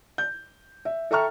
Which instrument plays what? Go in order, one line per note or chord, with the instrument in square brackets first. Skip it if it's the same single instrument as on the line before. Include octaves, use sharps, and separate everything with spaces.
[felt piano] G6
E5
A4 E5 G5 A#5 C#6 F6